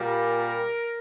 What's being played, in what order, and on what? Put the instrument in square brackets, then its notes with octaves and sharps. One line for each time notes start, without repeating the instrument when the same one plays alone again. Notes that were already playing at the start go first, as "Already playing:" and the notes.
Already playing: [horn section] A#2 G3 A#4